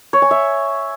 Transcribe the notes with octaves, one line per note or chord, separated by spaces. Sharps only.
C#5
G#5
E5